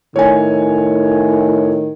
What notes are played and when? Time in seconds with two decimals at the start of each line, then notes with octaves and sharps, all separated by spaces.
0.16 A2 D#3 C#5 G#5